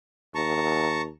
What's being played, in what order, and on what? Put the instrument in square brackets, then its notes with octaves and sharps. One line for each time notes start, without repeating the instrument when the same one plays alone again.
[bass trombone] D#2 [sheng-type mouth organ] A5 A#5 C#6